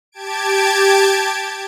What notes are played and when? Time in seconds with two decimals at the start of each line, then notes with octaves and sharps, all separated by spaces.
0.12 G4 A5 G#6 D7